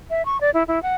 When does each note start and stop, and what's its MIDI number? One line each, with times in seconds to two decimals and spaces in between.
0.10 0.24 76
0.25 0.40 85
0.41 0.50 74
0.54 0.63 64
0.68 0.81 64
0.83 0.96 78